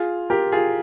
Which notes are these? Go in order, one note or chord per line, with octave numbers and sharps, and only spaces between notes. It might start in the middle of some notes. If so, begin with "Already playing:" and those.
Already playing: F4 G#4
G4 A#4
F4 G#4